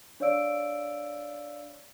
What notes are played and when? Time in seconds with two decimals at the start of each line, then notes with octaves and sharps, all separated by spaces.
0.20 D4 C#5 D5 F5 E6 D7